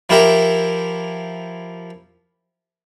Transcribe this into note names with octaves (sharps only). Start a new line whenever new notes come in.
F3 E4 G4 A#4 E5